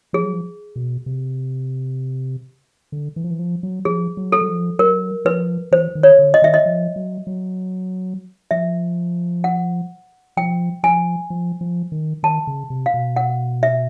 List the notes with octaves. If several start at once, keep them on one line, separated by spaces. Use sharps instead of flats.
F3 G#4
F#3
F3
B2
C3
D3
E3
F3
E3
F3
F#3
F3 G#4
F#3
A4
F#3
F3
F#3 A#4
F3 B4
E3 C5
D#3
C#5
D3
D#5
D#3 E5
D#5
F3
F#3
F#3
F3 E5
F#5
F3 G5
F3 G#5
F3
F3
D#3
D#3 A5
C#3
C3
F5
B2
F#5
E5